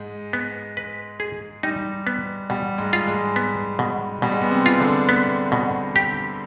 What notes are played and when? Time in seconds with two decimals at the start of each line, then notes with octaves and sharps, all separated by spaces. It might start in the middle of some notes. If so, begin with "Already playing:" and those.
Already playing: G#2 G#3
0.33 B3
0.77 B4
1.20 G#4
1.63 G3 D#4
2.07 B3
2.50 B2 G3
2.78 G#2 G#3
2.93 F4
3.07 G#2 G#3
3.36 B3
3.79 B2
4.22 B2 G3
4.32 G#3
4.41 B3
4.51 C3 C4
4.66 F4
4.80 D3 D4
5.09 B3
5.52 B2
5.96 G4